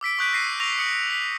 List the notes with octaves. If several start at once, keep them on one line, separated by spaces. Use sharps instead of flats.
D6 E6 B6 D7
C#6 D#6 F#6 G6 B6 D7
A#6 C7 D#7
C#6 E6 A#6 D#7 F7
D#6 C7 C#7
B6